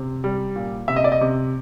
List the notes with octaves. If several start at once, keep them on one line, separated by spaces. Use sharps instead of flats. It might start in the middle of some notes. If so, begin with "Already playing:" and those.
Already playing: C3
G3
A#2
C3 E5
D#5
D5
D#5
C3